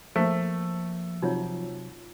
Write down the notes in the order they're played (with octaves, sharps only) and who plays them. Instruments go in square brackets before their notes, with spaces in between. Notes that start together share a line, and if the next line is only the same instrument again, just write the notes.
[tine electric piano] F3 [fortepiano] A3 [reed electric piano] A#3 [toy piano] C5
[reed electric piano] C3 F#3 [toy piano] D#4 F4 C#5